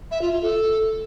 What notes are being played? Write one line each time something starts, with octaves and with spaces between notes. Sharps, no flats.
E5
F4
F4
A4